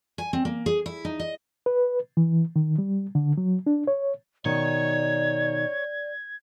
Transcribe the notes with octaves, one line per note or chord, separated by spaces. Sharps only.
G#5
C4
A#3
G#4
E4
D#4
D#5
B4
E3
D#3
G3
D3
F#3
D4
C#5
B2 D#3 D#4 C#5 D5 G#6